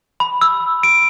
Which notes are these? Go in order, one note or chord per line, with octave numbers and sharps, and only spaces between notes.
B5
E6
D7